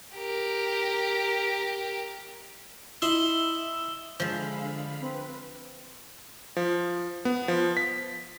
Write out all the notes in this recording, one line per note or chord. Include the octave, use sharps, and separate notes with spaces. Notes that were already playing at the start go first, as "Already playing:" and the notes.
G4 A#4
E4 D#5 E5 C6 E6 E7 G7
D3 F3 G#3 E5 F5 B5
C4 B4
F3
B3
F3
B6